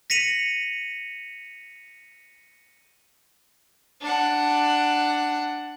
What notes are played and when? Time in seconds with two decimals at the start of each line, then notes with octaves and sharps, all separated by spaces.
0.10 A#6 B6 C#7 D#7 F7 F#7
4.01 D4 F#5